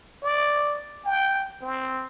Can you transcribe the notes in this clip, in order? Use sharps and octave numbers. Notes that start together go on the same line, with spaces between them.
D5
G5
C4